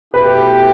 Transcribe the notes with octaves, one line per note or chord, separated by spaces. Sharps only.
B2 A3 E4 G4 B4